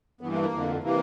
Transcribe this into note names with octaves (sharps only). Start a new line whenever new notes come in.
G2 E3 B3
A#3
A#3
F2 D3
C3 E3 A#3